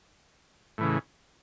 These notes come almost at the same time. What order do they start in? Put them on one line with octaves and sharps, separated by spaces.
A2 E3 C#3